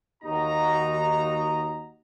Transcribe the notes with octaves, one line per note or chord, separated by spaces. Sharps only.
D#2 D#4 F#4 A#5